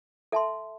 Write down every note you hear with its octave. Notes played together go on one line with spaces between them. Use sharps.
A4 E5 A5 C6